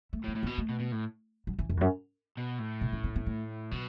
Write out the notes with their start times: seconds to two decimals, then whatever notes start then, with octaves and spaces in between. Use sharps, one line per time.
0.13 A3
0.24 A2
0.28 B3
0.35 A2
0.43 B3
0.46 B2
0.58 A3
0.69 B2
0.79 B2
0.92 A2
1.47 F#3
1.59 E3
1.70 F#2
1.77 E2
1.81 F#2
2.37 B2
2.59 A2
2.81 B2
2.93 C#4
3.04 B3
3.16 B3
3.26 A3
3.71 B2 F#3